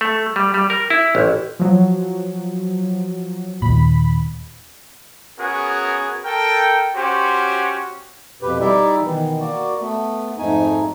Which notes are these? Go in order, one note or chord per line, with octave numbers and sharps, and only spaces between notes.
A3
G3
G3
A#4
E4
A1
F3 F#3
D#2 A#2 B5
B3 C#4 F#4 G#4 A#4
A4 A#4 G5
C#4 F#4 G4 C5
F2 B2 G4 B4
G3 D#4 E4 G4 D5 E5
B2 D#3 E3
A#3 F#4 D5
A3 B3
F2 G#2 A3 D#4 G#5